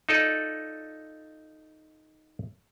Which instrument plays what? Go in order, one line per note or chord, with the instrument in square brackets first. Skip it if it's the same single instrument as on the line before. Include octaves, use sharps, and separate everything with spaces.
[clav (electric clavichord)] D#4 F4 A4 D5 D#5